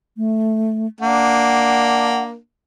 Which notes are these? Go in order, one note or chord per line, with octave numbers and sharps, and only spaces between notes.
A3
A#3 D4 F#5